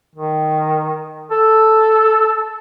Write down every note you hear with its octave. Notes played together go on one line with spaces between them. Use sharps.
D#3
A4